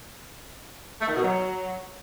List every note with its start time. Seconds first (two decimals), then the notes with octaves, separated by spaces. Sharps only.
1.01 A3
1.08 D#3
1.16 B2
1.23 F#3